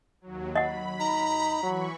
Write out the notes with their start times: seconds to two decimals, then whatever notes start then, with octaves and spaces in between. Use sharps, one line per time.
0.21 D#2 F#3
0.55 D#5 F#5 B5
1.00 D#4 A#5
1.63 E3 F#3 C#6